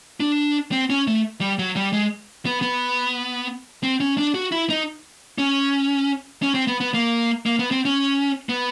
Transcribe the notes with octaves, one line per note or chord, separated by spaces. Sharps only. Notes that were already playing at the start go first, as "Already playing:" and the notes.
D4
C4
C#4
A3
G3
F#3
G3
G#3
B3
B3
C4
C#4
D4
F#4
E4
D#4
C#4
C#4
C4
B3
B3
A#3
A#3
B3
C4
C#4
B3